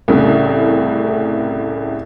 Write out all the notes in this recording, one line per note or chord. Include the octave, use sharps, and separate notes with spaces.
C2 A2 C#3